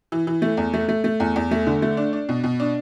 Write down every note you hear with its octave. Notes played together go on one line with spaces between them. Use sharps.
E3
E3
A3
E2
A3
A3
A3
E2
E2
A3
D3
A3
D4
D4
B2
B2
D4